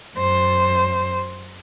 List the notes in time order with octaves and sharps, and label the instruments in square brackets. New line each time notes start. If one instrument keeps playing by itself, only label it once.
[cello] F#2 C5